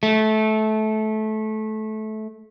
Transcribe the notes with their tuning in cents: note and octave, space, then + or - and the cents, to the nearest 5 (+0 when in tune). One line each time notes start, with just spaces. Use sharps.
A3 -20